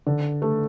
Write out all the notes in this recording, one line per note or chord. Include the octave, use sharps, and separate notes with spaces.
D3
A3